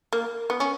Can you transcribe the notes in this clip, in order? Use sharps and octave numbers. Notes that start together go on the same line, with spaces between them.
A#3
B3
C#4